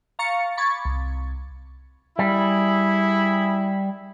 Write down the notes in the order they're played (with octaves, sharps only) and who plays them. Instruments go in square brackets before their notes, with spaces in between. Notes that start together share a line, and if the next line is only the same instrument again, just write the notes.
[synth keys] F5 A#5 C#6 A6 C#7
B5 C#6 D6 G#6 A6
C2
[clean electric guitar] G3 [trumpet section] E4 G#4 B5